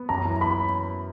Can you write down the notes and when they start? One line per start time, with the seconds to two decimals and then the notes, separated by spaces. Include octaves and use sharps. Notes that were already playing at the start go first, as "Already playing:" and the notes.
Already playing: B3
0.09 F#2 A#5
0.25 E3
0.41 B3 B5